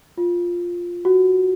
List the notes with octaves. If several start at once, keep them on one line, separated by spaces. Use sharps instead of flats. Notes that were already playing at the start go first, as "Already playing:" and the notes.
F4
F#4